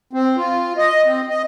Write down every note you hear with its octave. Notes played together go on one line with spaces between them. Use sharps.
C4
F4
D#5
C4
D#5